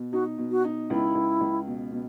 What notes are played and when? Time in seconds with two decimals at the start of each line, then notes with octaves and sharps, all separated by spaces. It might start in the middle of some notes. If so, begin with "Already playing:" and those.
Already playing: B2
0.12 D#4 F#4
0.38 B2
0.51 F#4
0.64 D#4
0.90 C#2 E4
1.15 C#2
1.41 C#2
1.67 B2
1.92 B2